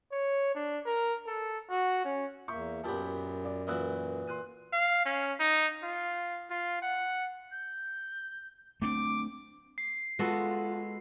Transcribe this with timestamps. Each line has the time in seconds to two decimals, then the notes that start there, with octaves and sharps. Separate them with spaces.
0.12 C#5
0.55 D4
0.86 A#4
1.27 A4
1.70 F#4
2.05 C#4
2.48 E2 A#3 E5 C#6 G6
2.84 F#2 A#2 B3 G4 A5
3.45 D5
3.67 A#2 E3 F#4 D#6 E6 F#6
4.27 C6 F#6 D#7
4.73 F5
5.06 C#4
5.40 D#4
5.83 F4
6.50 F4
6.82 F#5
7.52 G6
8.82 A3 C4 D4 D6
9.78 C7
10.19 G#3 B3 F4 F#4 A4